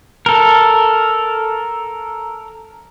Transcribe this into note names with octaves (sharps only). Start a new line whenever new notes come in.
A4 A#4